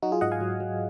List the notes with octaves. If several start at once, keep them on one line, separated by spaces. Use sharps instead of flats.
F#3 D#4 F#4
F4 G#4
G#2 D#5 F#5
F5 G#5
F#3
F#3